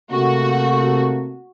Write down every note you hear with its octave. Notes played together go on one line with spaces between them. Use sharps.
C3 A3 A#3 F#4